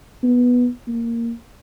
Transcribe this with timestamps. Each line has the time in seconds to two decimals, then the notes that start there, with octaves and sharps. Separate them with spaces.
0.23 B3
0.87 A#3